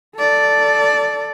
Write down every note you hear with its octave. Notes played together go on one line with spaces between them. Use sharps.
A4 D5